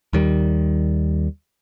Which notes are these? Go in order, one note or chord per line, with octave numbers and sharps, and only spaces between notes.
D#2 D#3 G3